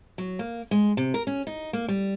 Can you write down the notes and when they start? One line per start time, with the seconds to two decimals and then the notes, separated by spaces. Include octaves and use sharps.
0.18 F#3
0.39 A#3
0.71 G#3
0.97 C3
1.14 A#4
1.27 C#4
1.47 D#4
1.73 A#3
1.89 G3